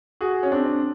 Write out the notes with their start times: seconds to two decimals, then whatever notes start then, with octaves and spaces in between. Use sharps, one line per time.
0.21 F#4 G#4
0.43 C#4
0.52 C4 D4